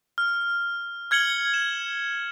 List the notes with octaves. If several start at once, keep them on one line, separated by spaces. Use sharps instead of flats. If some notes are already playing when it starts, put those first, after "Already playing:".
F6
F6 G#6 C#7 F#7 G7
E7